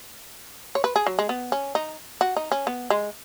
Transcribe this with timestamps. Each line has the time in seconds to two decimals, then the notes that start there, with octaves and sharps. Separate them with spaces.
0.75 C#5
0.84 B4
0.96 G#4
1.07 F#3
1.19 G#3
1.29 B3
1.52 C#4
1.75 D#4
2.21 F#4
2.36 D#4
2.52 C#4
2.67 B3
2.90 G#3